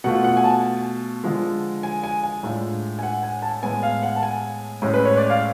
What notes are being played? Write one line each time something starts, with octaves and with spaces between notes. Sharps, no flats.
B2 A3 F4 F#5
F#5
G#5
A5
D3 F3 G#3
G#5
G#5
G#5
A2 G#3 D4 F4
G#5
F#5
G#5
A5
A2 G#3 B3 G#5
F5
F#5
A5
G#5
A2 G#3 C#4
B4
C#5
D5
F5